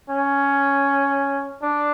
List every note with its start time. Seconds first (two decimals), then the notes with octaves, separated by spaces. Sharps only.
0.10 C#4
1.62 D4